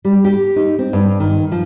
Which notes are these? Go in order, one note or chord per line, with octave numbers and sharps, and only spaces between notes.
G3
G4
D#4
C4
G2
D#3
F3